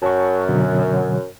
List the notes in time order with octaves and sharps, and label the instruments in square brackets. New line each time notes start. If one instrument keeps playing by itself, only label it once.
[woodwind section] F#2 [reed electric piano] A5 C#6
[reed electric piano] B2 D3 F#3